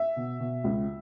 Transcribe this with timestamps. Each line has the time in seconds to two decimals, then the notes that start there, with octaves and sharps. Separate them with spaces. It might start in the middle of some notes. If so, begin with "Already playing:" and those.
Already playing: E5
0.16 B2
0.40 B2
0.64 C#2